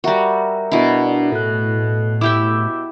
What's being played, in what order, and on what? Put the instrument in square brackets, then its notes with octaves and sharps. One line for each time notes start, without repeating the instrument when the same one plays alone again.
[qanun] G3 F#4 [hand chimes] A#4 E5 A#5
[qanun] B2 E4 [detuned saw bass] D4
[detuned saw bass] A2 [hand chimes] A4 F#6
[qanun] E4 G4 E5 [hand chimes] D6 E6 G6